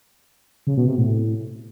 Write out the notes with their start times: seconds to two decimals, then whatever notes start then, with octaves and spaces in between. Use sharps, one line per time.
0.67 C#3
0.77 B2
0.87 C3
0.97 A2